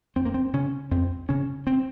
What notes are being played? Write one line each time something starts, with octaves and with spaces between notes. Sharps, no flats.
F2 C4
A#3
C4
C#3 C#4
F2 C4
C#3 C#4
C4